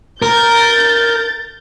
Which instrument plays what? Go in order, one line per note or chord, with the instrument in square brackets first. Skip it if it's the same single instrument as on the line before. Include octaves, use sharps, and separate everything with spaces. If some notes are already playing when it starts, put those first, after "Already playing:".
[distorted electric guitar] A#4 [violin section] G6 A6